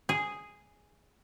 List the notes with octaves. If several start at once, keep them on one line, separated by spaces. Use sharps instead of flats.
G#4